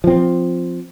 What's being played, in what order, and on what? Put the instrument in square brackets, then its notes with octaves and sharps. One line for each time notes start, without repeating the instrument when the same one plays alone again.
[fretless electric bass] F3 C4